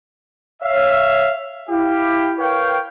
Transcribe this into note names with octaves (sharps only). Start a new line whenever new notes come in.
C#5 E5 F5
E4 G4 F5
A#4 B4 C#5 F5 G5